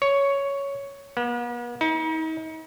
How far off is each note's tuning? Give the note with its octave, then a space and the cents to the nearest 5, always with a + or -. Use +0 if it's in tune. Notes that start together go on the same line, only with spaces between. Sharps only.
C#5 +5
B3 -45
D#4 +40